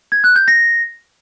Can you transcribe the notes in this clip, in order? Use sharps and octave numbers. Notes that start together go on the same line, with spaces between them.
G#6
F#6
G6
A#6